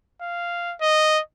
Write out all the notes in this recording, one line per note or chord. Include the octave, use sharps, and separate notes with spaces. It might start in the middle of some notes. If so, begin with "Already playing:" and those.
F5
D#5